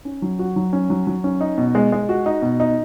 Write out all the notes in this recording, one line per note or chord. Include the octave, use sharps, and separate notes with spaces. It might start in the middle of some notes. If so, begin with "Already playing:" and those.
C#4
F#3
F#4
F#3
C#4
F#3
F#3
C#4
D#4
B2
G#3
G#3
F#4
D#4
B2
D#4